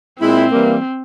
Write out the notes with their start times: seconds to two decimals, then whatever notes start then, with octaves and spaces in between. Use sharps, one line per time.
0.21 A#2 G#3 C4 E4
0.51 E3 G3 A#3